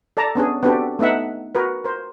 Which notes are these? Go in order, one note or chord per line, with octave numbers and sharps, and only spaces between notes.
A4 D5 A5 A#5
B3 C#4 D4 G#4
B3 C4 D4 F#4 G4 A4
A3 B3 D#4 E5 F#5
F#4 A#4 B4
A#4 C5